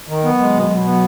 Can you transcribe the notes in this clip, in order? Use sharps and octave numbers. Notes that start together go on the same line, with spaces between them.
D#3
F#3 B3
G#3
B2
B2
B3